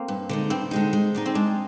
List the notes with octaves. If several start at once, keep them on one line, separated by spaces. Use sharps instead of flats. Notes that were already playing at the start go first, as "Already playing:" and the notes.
Already playing: A#3 C4
G2
D3 G#3 D#4
G2 C4
D3 G#3 D#4
G#3
D#4 G#4 D5
C4
G#3 D4